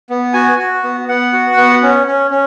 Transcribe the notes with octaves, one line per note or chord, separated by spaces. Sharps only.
B3
F#4 G#5
F#4
B3
B3 F#5
F#4
B3
C#4
C#4
C#4